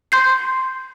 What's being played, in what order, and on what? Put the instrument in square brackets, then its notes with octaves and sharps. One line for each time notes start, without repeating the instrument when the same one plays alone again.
[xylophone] C6 G6 C7